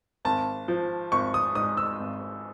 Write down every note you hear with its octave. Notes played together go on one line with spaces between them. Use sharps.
G#1 A5
F3
G#1 C#6
D#6
G#2 D#6
E6
G#1